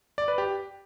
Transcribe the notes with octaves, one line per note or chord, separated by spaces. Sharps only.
D5
B4
G4